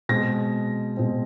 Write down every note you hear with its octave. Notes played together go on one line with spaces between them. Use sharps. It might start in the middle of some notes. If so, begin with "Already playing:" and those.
B2 G#3 C4 A#6
B2 G#3 C4